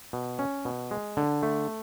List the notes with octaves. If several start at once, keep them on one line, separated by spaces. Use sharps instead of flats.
B2
C#4
B2
G#3
D3
A3